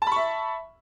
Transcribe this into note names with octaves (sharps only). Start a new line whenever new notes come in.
E5 A5 B5 C#6